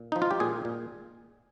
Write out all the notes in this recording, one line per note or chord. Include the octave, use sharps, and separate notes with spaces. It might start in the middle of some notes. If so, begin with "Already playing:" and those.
Already playing: A#2
F3 D#4
F4
G4
A#2 G#4
A#2